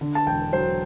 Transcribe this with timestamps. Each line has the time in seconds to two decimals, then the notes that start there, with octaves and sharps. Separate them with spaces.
0.01 D3
0.15 A5
0.27 E1 G5
0.53 F#3 C5